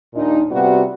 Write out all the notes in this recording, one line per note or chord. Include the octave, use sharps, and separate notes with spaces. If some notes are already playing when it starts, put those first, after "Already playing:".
D#2 A#2 D4 D#4
C3 G3 B3 F4 F#4